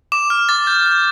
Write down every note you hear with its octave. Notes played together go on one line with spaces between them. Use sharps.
D6 E7
F6
D6 A6
G6
G6